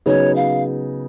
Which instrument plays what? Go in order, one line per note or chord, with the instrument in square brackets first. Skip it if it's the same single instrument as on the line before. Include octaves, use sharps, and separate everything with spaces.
[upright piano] C#3 F#3 B3 D#4 G#4 [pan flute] C#5
[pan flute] F5